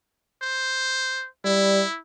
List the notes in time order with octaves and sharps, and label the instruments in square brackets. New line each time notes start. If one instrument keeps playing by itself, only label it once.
[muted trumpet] C5
[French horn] G3 [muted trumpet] E4